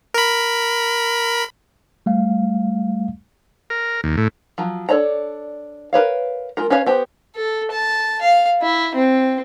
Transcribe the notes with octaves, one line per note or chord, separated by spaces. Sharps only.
A#4 B5
G3 A3 F5
A#4
D#2
A2
F3 F#3
D4 A4 C#5 D5 A#5
A#4 B4 C#5 F5
G#3 F4 A#4
C#4 B4 C#5 F5
B3 G4 C5
A4
A5
F5
E4
C4